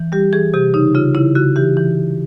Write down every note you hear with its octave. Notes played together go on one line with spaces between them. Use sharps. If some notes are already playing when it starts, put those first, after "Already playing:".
Already playing: E3
G3 G4
E3 G#4
C3 G4
C#3 D#4
C#3 F4
C#3 E4
C#3 F#4
E3 G4
E3